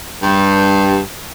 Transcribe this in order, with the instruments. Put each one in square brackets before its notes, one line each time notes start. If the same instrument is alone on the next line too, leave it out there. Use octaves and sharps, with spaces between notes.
[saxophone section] G2